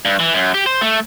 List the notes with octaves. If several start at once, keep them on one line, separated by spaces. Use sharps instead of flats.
G2
E3
F#2
G4
C5
A3